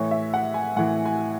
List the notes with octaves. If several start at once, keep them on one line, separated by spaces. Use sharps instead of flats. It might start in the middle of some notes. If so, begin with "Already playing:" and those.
Already playing: A2 E3 C#5
E5
F#5
G#5
A2 E3 F#5
G#5